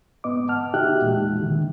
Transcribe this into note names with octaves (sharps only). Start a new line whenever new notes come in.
G#2 B3 D#5 D6
F#5 A5 F6
D#4 F#4 G4 E5 G5 F#6
E2 A#2 E3 G#3
D3 D#3